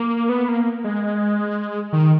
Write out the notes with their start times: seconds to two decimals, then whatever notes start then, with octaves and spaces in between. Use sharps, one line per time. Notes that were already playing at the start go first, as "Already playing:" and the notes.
Already playing: A#3
0.29 B3
0.48 A#3
0.84 G#3
1.93 D#3